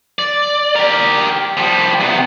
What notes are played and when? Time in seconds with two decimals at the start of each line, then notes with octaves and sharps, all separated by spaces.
0.19 D5
0.76 G4 A#4
1.57 F3 G3
2.00 C3 B3